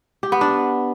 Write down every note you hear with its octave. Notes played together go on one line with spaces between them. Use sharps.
G4
B3
D4